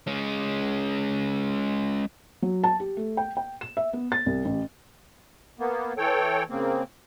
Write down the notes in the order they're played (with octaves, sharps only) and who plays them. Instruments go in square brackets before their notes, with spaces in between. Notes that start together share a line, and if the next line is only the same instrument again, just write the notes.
[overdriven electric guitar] G#3 C#4
[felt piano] F#3
A5
G4
A3
G5
G5
E7
E5
B3
A6
C2
A1
[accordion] A#3 B3
E3 A4 C#5 G5
C#3 A#3 C4